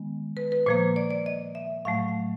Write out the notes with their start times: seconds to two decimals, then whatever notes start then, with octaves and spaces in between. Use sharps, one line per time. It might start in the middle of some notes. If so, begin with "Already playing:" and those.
Already playing: D#3 G#3 B3
0.37 B4
0.52 B4
0.66 A#2 F3 A#3 C5
0.96 D5
1.11 D5
1.26 D#5
1.55 E5
1.85 A2 F#3 A3 F5